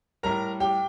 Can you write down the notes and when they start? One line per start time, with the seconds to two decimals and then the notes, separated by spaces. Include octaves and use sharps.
0.23 A2 G3 A#4 A#5
0.60 G4 G5